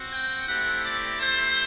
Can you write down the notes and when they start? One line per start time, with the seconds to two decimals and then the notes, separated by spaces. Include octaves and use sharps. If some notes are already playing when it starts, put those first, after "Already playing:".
Already playing: C4 F#4
0.12 G5
0.47 A3 C4 E4 G4 F#5
0.84 D5
1.19 A3 E4 G4 C5